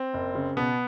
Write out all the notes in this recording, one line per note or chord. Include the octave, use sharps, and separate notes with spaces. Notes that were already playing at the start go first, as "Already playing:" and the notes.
Already playing: C4
F#1
C#3
B2 B3